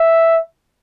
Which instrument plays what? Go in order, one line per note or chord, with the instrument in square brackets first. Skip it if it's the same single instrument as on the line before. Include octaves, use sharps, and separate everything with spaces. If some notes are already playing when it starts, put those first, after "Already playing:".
Already playing: [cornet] E5